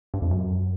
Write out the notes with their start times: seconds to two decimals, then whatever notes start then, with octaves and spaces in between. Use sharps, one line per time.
0.14 G2
0.22 F2
0.31 F#2